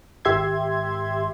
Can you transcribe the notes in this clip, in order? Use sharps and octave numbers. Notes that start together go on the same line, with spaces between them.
G#1 G4 E5 C6 G#6